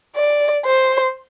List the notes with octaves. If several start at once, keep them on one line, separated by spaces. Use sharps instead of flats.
D5
C5